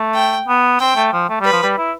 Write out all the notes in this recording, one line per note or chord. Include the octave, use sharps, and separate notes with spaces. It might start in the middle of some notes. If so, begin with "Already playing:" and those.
Already playing: A3
G5
B3
C4 G5
A3
F3
A3
G3 B4
F3
G3
E4